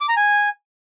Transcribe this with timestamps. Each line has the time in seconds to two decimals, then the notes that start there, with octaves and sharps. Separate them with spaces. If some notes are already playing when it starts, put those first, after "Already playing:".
0.01 D6
0.09 A#5
0.17 G#5